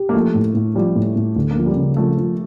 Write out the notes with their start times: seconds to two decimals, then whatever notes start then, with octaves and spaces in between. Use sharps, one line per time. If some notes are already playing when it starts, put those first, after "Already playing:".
Already playing: G4
0.09 A#3
0.14 F3 A3
0.34 A2
0.54 A2
0.75 F3 G3
0.95 A2
1.15 A2
1.36 D2
1.51 A#3
1.56 F3
1.66 G3
1.76 C#3
1.96 F3 A3
2.17 F3